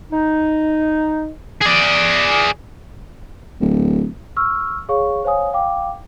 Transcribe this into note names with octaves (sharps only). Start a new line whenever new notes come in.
D#4
G#4 D5
D1
C#6 E6 F6
G#4 C#5 F5 C#6
C5 C#5 F5 G#5 D#6
F5 G5 D6